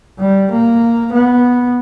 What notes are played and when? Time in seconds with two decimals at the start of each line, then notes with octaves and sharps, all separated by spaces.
0.19 G3
0.51 A#3
1.12 B3